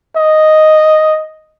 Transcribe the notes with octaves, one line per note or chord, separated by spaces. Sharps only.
D#5